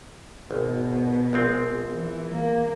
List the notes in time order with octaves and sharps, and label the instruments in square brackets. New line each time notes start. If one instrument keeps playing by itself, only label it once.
[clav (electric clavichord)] G#1 [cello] B2
[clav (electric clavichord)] A#1 G#3 C4
[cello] E3
A#3